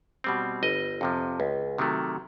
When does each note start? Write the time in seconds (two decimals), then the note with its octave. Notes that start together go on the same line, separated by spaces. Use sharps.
0.24 B2 G3 C4
0.63 G1 D#5
1.01 F2 C3 F3
1.40 C#2
1.78 C3 D#3 F#3 A3